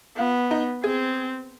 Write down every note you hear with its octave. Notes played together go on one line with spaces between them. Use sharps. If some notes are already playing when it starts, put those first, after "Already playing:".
B3 F4
D#4
C4 G#4